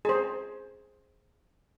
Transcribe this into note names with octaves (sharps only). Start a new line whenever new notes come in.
G#4 C5